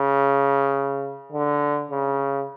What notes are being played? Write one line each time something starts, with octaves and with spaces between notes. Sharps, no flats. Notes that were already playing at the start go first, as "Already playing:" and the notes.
Already playing: C#3
D3
C#3